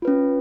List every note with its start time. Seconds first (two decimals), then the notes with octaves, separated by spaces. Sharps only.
0.02 F4
0.05 B4
0.08 C#4